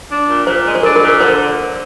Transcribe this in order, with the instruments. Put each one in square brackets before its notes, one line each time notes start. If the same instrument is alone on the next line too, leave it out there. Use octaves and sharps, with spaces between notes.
[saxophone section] D4
A#2
[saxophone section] A#2 [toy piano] C5
[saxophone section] G#3
[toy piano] C5
[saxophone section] D4 [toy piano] A#4
[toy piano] A#4
[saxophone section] A#2
[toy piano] A#4
[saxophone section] D3 [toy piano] C5